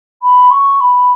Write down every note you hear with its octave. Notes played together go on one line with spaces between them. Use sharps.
B5
C#6
B5